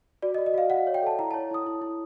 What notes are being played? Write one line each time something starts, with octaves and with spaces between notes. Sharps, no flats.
F#4 D5
D#5
F#4
D#5
F#4 F5
F#4 F#5
C#5
G5
A4 A5
E4 A#5
A5
C#5
E4 D#6
E4
E4